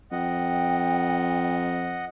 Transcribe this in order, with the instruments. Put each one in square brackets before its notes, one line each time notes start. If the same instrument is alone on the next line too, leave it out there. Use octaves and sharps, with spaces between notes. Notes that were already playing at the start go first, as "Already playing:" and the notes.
[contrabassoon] F2 [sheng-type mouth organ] D#5 F#5 [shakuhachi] G5